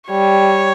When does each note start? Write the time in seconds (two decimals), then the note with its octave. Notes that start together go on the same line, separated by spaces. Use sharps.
0.11 G3 C#5